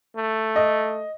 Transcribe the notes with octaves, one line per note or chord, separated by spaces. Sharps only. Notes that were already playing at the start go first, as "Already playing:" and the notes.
A3
D#5